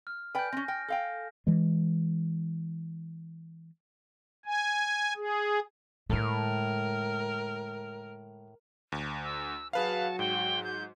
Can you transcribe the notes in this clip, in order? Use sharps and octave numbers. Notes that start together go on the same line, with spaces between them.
F6
B4 D5 G5 G#5 G6
C4 C#4 A#6
G5 F6 A#6
A4 F5 G5
E3 G#3
G#5
G#4
A2 D3 G#3 A#4
D2
E6
F#3 F#4 G#4 B4 F5 A5
G#2 G5
G6